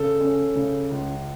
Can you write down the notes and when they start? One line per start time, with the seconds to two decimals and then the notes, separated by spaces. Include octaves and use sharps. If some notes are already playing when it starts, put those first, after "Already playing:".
Already playing: C#3 A4
0.21 C#4
0.56 C#3
0.90 C#2